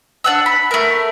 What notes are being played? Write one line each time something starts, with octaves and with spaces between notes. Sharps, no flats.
D4 F#5 E6
B5
A3 A#4